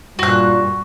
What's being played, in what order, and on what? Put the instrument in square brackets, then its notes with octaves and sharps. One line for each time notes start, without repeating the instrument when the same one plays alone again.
[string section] G2 [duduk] A#2 [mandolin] F#4 F#6